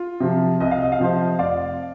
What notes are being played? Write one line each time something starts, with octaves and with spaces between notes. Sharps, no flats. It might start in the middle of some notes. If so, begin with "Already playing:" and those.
Already playing: F4
C3 F3
C2 D#5
F5
D#5
F5
C3 F3 C5 D#5
F1 D5 F5